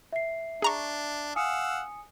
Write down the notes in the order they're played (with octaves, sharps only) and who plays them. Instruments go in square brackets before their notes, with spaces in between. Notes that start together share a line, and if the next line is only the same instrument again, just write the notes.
[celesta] E5 C7
[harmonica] D4 [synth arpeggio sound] G#4 A#5 C#6
[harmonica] F5 F#5 E6 [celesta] G#5 D#6 C#7